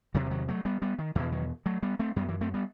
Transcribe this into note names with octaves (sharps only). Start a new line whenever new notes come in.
E2 C3 D#3 F#3
E3
D#3 F#3
F#3 A3
G3 B3
G3 B3
D#3
E2 B2 E3
D#3 F#3
F#3 A3
G3 B3
A3 C4
F#2 G3 B3
E3
A3 C4
G3 B3